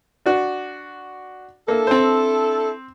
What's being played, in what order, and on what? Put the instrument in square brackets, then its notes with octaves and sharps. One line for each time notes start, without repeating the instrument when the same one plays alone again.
[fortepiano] D4 F#4
[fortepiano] A#3 [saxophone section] D4 E4 A4
[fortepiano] C4 C5